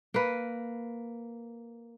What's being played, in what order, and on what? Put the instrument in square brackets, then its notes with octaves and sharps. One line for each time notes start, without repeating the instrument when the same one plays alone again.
[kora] A#3 B4